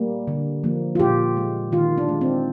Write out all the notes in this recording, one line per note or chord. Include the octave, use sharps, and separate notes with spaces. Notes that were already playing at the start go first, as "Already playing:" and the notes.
Already playing: G3 A#3
D3
F3 A#3
F4
A#2 G4
G#3
D#3 F4
D4
G#3
C4